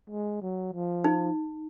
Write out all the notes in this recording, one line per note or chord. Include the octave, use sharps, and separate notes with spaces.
G#3
F#3
F3
D#4